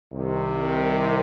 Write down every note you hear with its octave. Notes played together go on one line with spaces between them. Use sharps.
C2 C3 D#3